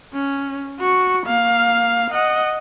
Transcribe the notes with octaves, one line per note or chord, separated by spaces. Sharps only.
C#4
F#4 C#6
A#3 F5
D#5 F#5